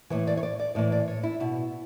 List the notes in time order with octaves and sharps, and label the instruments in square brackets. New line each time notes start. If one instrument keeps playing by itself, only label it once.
[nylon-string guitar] A2 E3 C#5
D5
C#5
D5
D5
A2 E3 D5
D5
C#5
E4
B2 E4